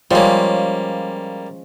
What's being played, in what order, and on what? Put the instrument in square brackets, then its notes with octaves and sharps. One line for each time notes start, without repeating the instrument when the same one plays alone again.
[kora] F3 G#3 C#4 [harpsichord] G3 A#3